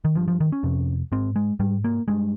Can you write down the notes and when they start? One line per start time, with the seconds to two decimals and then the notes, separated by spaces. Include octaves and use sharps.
0.05 D#3
0.16 G2 F3
0.28 F3
0.40 D#3
0.52 C#4
0.63 F2 C3
1.12 G#2 C4
1.36 G#3
1.60 G#2 G3
1.84 A#3
2.08 G2 G#3